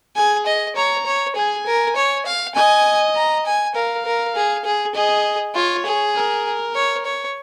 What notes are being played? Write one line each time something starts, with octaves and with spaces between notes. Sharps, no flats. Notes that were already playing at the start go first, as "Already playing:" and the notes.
G#4 G#5
D#5
C#5 A#5
C#5
G#4 G#5
A#4
C#5
F5
D#5 G#5
A#5
G#5
A#4 F5
A#4
G#4
G#4
G#4 D#5
F4 C#5
G#4
A#4
C#5
C#5